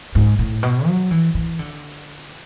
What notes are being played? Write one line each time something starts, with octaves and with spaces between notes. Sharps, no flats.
G#2
A2
B2
F#3
E3
E3
D3